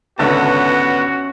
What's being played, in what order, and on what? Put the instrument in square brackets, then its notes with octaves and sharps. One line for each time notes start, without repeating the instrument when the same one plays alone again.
[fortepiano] G#1 C#2 D3 [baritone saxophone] B3 [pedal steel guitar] C#4 E5 A5 [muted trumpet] F#4